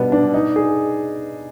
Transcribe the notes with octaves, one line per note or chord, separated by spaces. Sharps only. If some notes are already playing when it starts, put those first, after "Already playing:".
Already playing: B2 G3 B3 D4
D4
D#4
G#4